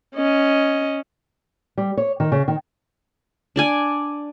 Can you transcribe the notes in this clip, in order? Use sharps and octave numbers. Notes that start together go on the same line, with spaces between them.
C#4 D#5
G3
C#5
D#3
C#3
D#3
D4 D5 G#5